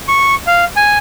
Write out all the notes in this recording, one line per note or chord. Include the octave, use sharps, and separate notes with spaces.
C#6
F5
G#5